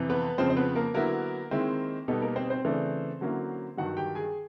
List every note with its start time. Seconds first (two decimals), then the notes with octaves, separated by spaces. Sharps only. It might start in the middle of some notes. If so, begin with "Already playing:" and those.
Already playing: F2 C3 E3
0.10 B3 B4
0.38 F2 C#3 F3 C4 C5
0.50 C5
0.57 B3 B4
0.75 A#3 A#4
0.94 D3 F#3 A#3 B3 E4 A#4
1.51 D#3 G#3 C4 E4
2.08 B2 G3 B3 D#4 A4
2.22 A#3 A#4
2.36 C4 C5
2.50 C4 C5
2.65 C#3 E3 A3 D4
3.21 D3 F#3 A#3 C#4 E4
3.77 G2 D#3 F#3 F#4 F#5
3.97 G4 G5
4.15 G#4 G#5